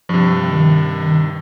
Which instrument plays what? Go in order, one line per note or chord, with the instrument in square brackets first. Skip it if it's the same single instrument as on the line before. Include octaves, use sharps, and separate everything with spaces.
[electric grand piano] G2 C3 [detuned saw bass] F3
[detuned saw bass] D#3